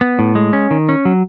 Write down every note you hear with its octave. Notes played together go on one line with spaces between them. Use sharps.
B3
A2
G#3
C#4
D#3
C#4
F#3